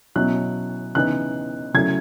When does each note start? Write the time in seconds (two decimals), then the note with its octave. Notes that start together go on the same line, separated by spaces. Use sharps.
0.15 B2 F#3 C#4 E4 F#6
0.95 C#3 E3 B3 D#4 F#6
1.74 C#3 F#3 A3 E4 G#6